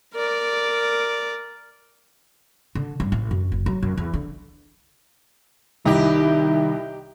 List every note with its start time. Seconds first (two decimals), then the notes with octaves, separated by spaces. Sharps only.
0.14 A#4 D5
2.75 D3
3.00 G2
3.12 A1
3.31 F#2
3.52 F#1
3.66 F#3
3.83 F#2
3.97 E2
4.13 D3
5.85 C2 D#3 D#4 E4 G4